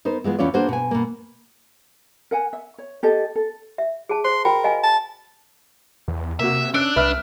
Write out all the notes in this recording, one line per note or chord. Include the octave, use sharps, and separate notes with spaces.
B3 D#4 A#4 C5
E3 G#3 B3 F4
E2 E3 C#4 F4 C#5 D5
A#3 B3 D4 F#4 G#4 C5
B2 G#5
B2 A#3
A#4 F#5 G#5
E5
C#5
G4 A4 D#5
A4
E5
G#4 A5
C5 C6
F#4 A#4 G5 B5
D#5 F5 G#5
A5
E2
C3 A#3 F#4 E5
C#4 D4 E6 F#6 D7
C2 B4 E5 F6